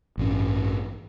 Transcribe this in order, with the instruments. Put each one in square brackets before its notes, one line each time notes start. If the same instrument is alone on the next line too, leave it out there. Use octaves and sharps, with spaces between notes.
[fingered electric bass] A1 G2 C#4